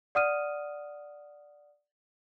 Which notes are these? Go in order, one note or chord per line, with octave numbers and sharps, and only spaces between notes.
D5 F#5 D#6 F6 D#7